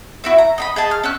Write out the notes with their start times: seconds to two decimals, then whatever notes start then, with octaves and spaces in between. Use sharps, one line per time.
0.24 E4 F#4 E5
0.38 A#5
0.58 D#5 A#5 B5
0.76 G#4 D#5 A5
0.91 F6
1.04 C#4 E6 F#6